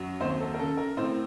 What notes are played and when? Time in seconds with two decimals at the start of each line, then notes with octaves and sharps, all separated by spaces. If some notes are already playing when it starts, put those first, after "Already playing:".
Already playing: F#2 F#3
0.20 D#2 C4 C5
0.40 A4
0.54 A#4
0.59 C#3 A4
0.77 A#4
0.97 A2 C4 C5